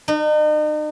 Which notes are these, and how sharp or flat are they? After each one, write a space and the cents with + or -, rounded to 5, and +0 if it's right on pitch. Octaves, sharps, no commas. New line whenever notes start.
D#4 -40